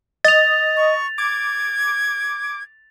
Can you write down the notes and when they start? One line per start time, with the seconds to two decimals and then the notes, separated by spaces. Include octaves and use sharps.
0.25 D#5 A6 F7
0.77 C#6
1.18 D6 G#6